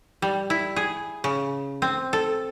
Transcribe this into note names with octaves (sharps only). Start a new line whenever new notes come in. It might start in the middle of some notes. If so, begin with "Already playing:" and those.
G3
E4
G#4
C#3
C4
A4